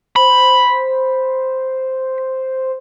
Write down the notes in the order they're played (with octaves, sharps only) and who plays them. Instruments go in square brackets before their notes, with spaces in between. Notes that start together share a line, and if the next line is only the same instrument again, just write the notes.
[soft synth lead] C5 [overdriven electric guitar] B5